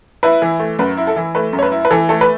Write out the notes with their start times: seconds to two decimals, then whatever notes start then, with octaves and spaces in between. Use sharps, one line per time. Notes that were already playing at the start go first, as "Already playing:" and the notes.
0.23 E4 B4
0.42 E3
0.59 A3
0.79 F#2 B4
0.97 E4
1.07 A4
1.16 E3
1.35 A3 B4
1.53 F#2
1.59 C#5
1.63 B4
1.72 E4
1.85 B4
1.91 E3 A4
2.09 A3 A4
2.21 B4